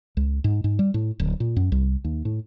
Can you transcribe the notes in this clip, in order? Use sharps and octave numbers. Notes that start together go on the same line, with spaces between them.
C#2
G#2
G#2
G3
A2
D1
A#2
F#2
C2
D#2
A2